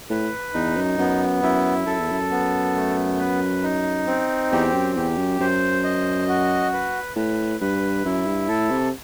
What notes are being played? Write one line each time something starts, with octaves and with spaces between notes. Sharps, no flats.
A2 B4
E2 D#4
F#2
F#2 B3
F#2 E4
F#2 A4
E2
F#2
B3
A3
B4
D#4
C4
E2 G4
F#2
E2 G4
F#2
F#2 C5
D#5
F#4
B4
A2 B4
G2 B4
F#2 E4
G2
A2 A4
C3